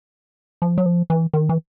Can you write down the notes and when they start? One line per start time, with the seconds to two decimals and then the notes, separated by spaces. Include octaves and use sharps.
0.62 F3
0.78 F#3
0.86 F3
1.10 E3
1.33 D#3
1.49 E3